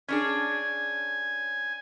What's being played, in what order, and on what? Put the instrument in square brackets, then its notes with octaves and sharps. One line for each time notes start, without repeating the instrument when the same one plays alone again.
[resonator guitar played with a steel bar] C#4 D4 G#4 [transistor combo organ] G#5